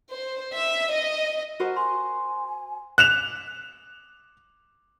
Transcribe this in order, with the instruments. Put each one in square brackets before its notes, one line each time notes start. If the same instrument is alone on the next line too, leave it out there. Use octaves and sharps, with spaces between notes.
[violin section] C5
E5
D#5
[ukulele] F#4 A#4 C5
[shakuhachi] G#5 [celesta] C6
[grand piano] F#6 E7 F7